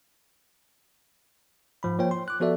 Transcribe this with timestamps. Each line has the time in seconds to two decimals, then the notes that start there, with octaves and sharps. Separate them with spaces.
1.83 G#2 F3 B5
1.99 F3 A#3 C#5 G5
2.11 C6
2.28 D6 F#6
2.40 F3 B3 F#4 A4 D5 E5